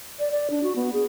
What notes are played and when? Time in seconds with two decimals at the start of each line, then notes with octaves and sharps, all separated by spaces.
0.19 D5
0.31 D5
0.50 D4
0.63 F#4
0.76 B3
0.93 G#4